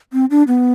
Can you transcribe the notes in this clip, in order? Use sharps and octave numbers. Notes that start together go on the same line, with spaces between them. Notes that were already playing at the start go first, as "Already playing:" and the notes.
C4
D4
B3